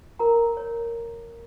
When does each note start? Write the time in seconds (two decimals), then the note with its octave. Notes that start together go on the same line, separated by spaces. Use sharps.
0.19 F#4 A#4 A#5
0.57 C#5